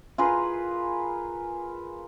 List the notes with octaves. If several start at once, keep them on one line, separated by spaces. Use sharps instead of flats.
F4 G#4 A#4 B4